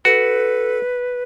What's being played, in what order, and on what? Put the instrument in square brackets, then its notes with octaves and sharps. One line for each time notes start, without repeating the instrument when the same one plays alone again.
[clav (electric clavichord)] F#4 [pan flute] A4 [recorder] B4